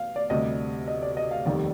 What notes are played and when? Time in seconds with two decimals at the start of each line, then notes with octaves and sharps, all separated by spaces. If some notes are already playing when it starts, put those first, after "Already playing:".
Already playing: F5
0.16 D5
0.30 D2 C3 G3 D#5
0.88 D#5
1.03 D5
1.17 D#5
1.31 F5
1.45 F1 D#2 D#3 G3 D5